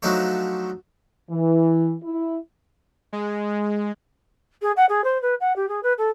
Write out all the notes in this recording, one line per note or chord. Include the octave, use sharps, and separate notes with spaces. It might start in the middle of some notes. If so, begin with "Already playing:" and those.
F3 F#3 A3 D4 D#4 C#5
E3
E4
G#3
G#4
F#5
G#4
C5
B4
F#5
G4
G#4
B4
A4